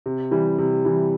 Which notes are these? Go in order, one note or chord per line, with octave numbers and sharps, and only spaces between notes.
C3
E3 G3
C3
E3 G3